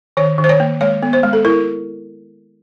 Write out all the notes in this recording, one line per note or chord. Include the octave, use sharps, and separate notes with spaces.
D#3 C#5
D#3
C5
C#5
A#3
G#3 C#5
B3
C5
G#3
A4
E4 A#4